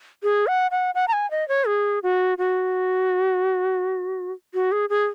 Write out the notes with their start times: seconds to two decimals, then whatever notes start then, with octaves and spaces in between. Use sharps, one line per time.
0.23 G#4
0.47 F#5
0.71 F#5
0.95 F#5
1.08 A#5
1.13 G#5
1.31 D#5
1.48 C#5
1.67 G#4
2.03 F#4
2.38 F#4
4.54 F#4
4.72 G#4
4.90 G#4